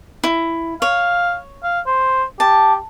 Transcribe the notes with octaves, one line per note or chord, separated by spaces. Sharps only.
E4
C#5 F5
F5
C5
G4 A5